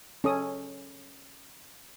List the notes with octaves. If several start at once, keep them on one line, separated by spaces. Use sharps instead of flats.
C#4 A4 D#6